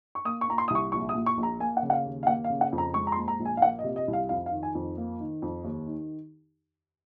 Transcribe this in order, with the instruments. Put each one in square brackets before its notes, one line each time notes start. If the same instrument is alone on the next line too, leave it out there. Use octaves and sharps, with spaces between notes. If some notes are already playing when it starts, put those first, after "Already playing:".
[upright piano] C#6
A#3 D#6
C#6
A#2 A#5
C6
C2 D#6
C#6
A#1 C#6
D#6
A#2
C#6
A#1
A#5
A#3 G#5
F#5
C#3
F#5
F5
D#2
F5
A#3 F#5
F5
C#3
F#5
F2
A#5
G#3 C#6
A#5
C6
A#2
A#5
A#1
G#5
F5
A#3 F#5
D#5
C3
D#5
C2
F5
F2 F5
F5
D#3
G#5
F2
A#3
D#3
F2
D#2
D#3